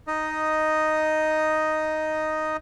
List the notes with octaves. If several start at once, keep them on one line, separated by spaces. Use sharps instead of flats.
D#4 D#5